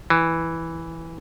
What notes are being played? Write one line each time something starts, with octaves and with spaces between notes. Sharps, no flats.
E3